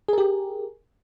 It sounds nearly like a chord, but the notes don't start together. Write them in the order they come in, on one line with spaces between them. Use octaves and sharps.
G#4 A#4 G4